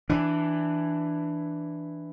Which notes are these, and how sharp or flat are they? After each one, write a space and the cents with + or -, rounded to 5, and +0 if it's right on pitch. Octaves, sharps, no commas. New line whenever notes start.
E3 +0 D4 +0